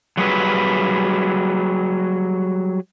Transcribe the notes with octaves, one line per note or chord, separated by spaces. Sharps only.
F#3 G3 G#4 B4